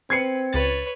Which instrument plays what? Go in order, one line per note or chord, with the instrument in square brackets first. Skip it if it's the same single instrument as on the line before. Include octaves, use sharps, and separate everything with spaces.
[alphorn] C4 [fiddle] B4 [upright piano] G#6 C7 C#7
[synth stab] C#2 A6 [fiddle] B4 C#5